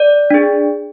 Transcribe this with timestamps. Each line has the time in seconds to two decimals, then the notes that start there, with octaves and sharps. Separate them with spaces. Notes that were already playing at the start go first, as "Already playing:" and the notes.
Already playing: D5
0.31 D4 G#4